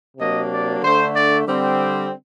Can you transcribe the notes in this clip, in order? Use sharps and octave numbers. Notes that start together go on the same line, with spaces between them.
C3 F#3 A#3 D4 D#5
D5
D3 A3 D4 C5
D5
D3 G3 C4